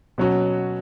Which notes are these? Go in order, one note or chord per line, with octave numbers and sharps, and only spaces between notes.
B2 F#3 C#4 F#4